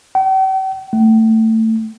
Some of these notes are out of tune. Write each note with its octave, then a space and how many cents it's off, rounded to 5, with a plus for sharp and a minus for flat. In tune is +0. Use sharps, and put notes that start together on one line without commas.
G5 -45
A3 +20